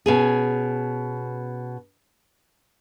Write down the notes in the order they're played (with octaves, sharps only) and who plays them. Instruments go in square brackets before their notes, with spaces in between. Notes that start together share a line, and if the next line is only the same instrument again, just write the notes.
[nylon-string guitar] B2 C#4 G#4